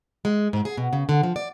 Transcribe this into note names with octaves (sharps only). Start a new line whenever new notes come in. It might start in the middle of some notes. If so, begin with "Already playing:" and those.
G#3
G#2
G#4
B2
C#3
D3
F3
D5